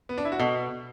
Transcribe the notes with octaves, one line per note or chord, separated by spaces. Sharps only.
B3
D4
E4
F#4
B2 A4